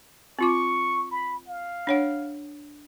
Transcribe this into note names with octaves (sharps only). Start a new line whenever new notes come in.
C4 F4 C#6 D6
B5
F5
D4 C#5 F#5